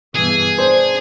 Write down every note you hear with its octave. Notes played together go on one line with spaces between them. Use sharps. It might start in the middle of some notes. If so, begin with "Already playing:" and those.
G2 B2 E3 G#4
D4 C5